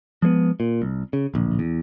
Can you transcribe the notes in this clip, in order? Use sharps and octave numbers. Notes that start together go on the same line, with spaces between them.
F3 G#3 A#3 B3
A#2
C2
C#3
D1 A#1
E2